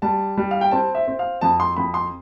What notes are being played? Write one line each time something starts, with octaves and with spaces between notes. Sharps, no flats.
G3 A5
G3
F5
G5
C4 A5
E5
C4
F5
F2 A5
C6
F2 B5
C6